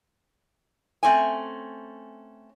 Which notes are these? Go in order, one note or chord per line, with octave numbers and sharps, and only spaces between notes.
A3 C4 C#4 G#5